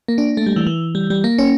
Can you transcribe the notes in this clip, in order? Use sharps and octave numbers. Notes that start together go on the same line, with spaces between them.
A#3
D4
A3
G3
E3
E3
G3
G3
A#3
C#4